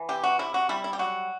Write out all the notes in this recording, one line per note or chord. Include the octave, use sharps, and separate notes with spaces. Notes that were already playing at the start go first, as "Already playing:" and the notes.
Already playing: E3
C3 G4
F#4
C3 E4
F#4
G3 E4
E4
G4
F#3 F#4